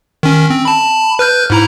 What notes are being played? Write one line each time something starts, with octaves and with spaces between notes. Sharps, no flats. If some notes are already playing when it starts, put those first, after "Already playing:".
D#3 C#4
C4
A5 B5
B4 F6 G6
G#2 E4 A#5